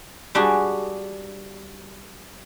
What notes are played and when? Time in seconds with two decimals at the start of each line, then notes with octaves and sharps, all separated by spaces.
0.35 G3 D4 F#4 G#4